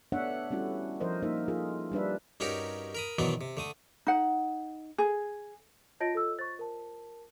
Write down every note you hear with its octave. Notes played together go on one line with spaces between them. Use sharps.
A3 B3 D4 C#5 E5 F#5
G3 A3 C#4 E4 F#4
F3 A#4 C5 D#5
A#3 D#4 A#4 C5 E5
A3 F4 G#4 A#4
G3 D4 B4 E5
G2 C#4 D#4 F#4 G4 A#4
A#4 B5 D#6
B2 D#3 E3 F#3 B3 D4
C3
D3 A3 D#6
D#4 F#5
G#4
F4 C#5 D#5 A5 A#6 D7
A4 E6
C5 C#6 A6
A#4 A5